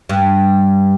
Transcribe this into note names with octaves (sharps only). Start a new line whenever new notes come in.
G2